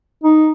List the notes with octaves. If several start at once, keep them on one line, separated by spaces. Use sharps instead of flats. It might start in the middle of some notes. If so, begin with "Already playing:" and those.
D#4